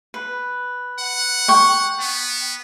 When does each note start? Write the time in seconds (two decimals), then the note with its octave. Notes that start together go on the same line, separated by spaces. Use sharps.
0.14 B4
1.00 F#5
1.48 G5 C#6
2.00 B3